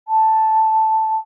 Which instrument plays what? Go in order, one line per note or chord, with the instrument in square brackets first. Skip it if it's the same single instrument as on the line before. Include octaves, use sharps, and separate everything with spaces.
[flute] A5